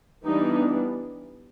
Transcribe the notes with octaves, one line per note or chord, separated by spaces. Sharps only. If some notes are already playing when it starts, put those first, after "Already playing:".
E3 G3 B3 D4 D#4